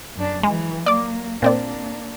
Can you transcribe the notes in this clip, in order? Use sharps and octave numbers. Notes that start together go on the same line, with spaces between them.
F#2 D4
E3 F#3 G#3
F#3 A#3 D5 D6
A#2 A#3 C4 D4 D5